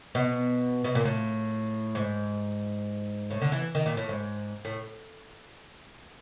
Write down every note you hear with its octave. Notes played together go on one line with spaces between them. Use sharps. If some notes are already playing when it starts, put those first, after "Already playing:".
B2
B2
A#2
A2
G#2
A2
D3
E3
D#3
A#2
A2
G#2
A2